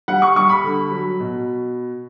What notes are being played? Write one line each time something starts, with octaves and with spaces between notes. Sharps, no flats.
G3 F#5
C#6
G3 C#6
B5
D3
F#3
B2